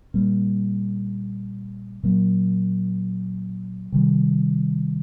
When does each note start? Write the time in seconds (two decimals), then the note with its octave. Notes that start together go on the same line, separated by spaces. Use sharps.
0.14 A#2 G3 A#3
2.03 A#2 F#3 A#3
3.92 C3 D#3 G3